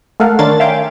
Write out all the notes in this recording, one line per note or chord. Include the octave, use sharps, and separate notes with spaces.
A3 A4 A#4 F5 F#5
D#3 D4 A#4 C#5 C6 A6
E5 F5 G5 G#5 C6 D6